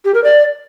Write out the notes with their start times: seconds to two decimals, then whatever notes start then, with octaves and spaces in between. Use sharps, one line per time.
0.05 G4
0.14 A#4
0.24 D5